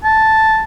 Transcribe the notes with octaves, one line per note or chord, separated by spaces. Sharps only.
A5